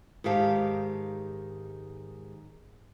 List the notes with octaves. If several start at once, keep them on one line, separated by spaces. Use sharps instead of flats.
G#2 D#3 G4 F5 A5